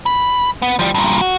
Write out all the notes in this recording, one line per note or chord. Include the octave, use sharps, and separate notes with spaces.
B5
B3
F3 G3
G2 A#2
F#4